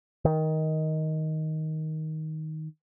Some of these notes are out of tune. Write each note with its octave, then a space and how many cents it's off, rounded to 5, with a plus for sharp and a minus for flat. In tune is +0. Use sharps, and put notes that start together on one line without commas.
D#3 +10